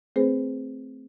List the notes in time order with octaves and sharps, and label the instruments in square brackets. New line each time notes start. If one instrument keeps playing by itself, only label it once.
[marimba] A3 C4 G#4 B4 C5